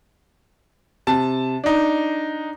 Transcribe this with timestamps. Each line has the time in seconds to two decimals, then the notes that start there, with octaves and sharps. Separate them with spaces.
1.07 C3 A5
1.64 D4 D#4